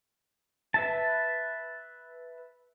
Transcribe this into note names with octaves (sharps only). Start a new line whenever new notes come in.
B4 E5 A5